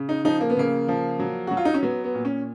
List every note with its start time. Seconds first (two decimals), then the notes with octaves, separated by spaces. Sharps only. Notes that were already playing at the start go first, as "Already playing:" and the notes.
Already playing: C#3
0.09 D#4
0.25 F3 D#4
0.41 A#3
0.50 B3
0.57 C#3 A#3
0.88 F3
1.19 F#3
1.47 F#3 F#4
1.57 F4
1.65 D#4
1.74 C#4
1.83 F#3 B3
2.04 B3
2.14 A#2
2.25 C#4